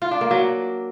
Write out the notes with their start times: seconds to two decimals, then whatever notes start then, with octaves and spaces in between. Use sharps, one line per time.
0.02 F4
0.11 D4
0.21 A#3
0.31 F#3